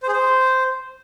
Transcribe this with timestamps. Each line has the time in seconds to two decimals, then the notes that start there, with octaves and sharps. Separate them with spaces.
0.03 C5
0.08 G#4
0.13 C5